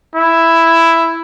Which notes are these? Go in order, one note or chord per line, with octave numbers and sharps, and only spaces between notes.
E4